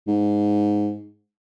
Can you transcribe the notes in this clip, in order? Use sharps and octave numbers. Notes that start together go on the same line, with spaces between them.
G#2